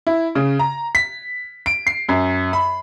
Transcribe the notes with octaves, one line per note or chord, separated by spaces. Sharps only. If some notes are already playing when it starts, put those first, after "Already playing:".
E4
C#3
A#5
B6
D7
C7
F#2
B5